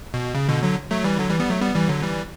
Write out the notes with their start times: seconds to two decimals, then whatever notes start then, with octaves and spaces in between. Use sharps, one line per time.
0.14 B2
0.35 C#3
0.49 B2 D3
0.63 D3 F#3
0.91 F#3 A3
1.04 E3 G3
1.19 D3 F#3
1.29 E3 G3
1.40 G3 B3
1.50 F#3 A3
1.61 G3 B3
1.75 E3 G3
1.88 D3 F#3
2.03 E3 G3